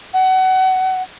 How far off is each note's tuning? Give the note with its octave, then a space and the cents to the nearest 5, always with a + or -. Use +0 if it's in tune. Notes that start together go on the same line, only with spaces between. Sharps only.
F#5 +25